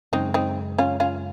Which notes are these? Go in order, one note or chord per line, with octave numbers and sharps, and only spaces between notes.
F#2 C#3 G#3 C4 D#4
C4 D#4
C#4 F4
C#4 F4